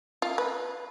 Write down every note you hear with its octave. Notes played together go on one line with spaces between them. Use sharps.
F4
B4